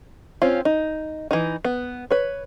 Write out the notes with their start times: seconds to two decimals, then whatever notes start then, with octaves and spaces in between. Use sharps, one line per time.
0.42 C4 C#4 F4
0.65 D#4
1.31 E3 D#4
1.65 B3
2.11 B4 C#5